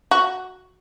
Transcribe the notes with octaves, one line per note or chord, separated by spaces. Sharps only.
F#4